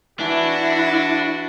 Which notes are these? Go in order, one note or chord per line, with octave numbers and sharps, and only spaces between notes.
E3 D4 E4 F#4